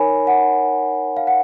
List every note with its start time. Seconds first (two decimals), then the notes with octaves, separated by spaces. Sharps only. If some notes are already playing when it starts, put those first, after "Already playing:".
Already playing: D#4 A#4 C#5 G#5 B5
0.27 F#5
1.17 F5
1.27 F#5